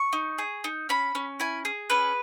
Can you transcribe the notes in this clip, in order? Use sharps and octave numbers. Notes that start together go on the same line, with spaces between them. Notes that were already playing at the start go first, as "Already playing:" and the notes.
Already playing: C#6
D#4
G#4
D#4
C#4 B5
C#4
E4 G#5
G#4
C#4 B4